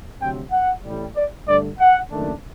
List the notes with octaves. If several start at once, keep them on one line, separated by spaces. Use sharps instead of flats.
D2 C3 F#3 C4 G5
F#5
A1 A2 G3
D5
G2 D3 A3 D5
F#5
F#1 F#2 D#3 A3 D4